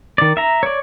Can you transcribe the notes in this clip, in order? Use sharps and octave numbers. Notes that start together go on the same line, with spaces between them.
D#3 D5
E5 A#5
C#5 D5